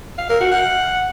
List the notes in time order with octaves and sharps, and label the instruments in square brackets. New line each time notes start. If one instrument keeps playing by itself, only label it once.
[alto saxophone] F5
A#4
F#4
F#5